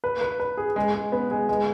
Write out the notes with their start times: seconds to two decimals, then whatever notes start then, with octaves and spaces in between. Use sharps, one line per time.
0.04 B4
0.21 B4
0.40 B4
0.57 G#4
0.76 G#3
0.94 G#3
1.12 B3
1.31 G#3
1.49 G#3